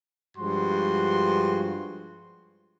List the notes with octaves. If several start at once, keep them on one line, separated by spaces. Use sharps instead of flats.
G2 F3 G#3 F#4 C6